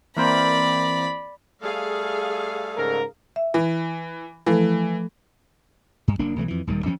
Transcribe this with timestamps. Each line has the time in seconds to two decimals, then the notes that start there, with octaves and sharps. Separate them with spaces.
0.17 E3 A#3 C4 D5 B5
1.62 G3 A3 G#4 A4 F5
2.77 G#2 C#3 A#4
3.36 E5
3.54 E3
4.46 E3 F3 A3 A4
6.08 G2
6.19 F#1 A#3 D4
6.36 B1 E3 F#3 A3
6.48 F2 E3
6.67 D#1 D#2 D#3 G3
6.86 D#2 F3 C#4